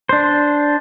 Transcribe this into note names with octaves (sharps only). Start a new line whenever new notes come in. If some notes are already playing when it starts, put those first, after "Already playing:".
D4 C5